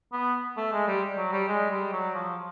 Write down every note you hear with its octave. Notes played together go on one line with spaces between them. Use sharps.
B3
A3
G#3
G3
F#3
G3
G#3
G3
F#3
F3